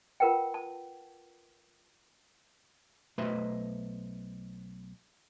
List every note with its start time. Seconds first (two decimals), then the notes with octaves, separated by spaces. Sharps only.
0.20 F4 A#4 B4 F#5 G5
0.54 A5
3.18 B1 A3 B4 C5 D#5 E5